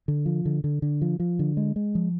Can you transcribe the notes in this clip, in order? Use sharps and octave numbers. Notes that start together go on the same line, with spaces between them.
D3
F3
D3
D3
D3
F3
F3
D3
G#3
G#3
F3